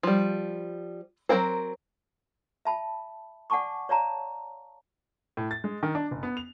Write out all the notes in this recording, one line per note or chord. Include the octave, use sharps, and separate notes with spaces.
F3 G3
F#3 A#3 C4 A#4 C5
E5 A5 B5
D5 F#5 G#5 A5 C#6 D6
C#5 D5 F5 A5 A#5
A2
A6
G#3
D#3
D4
F#1
B3
F7